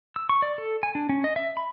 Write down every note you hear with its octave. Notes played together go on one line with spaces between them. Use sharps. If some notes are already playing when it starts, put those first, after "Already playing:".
E6
C#6
D5
A4
G#5
D4
C#4
D#5
E5
B5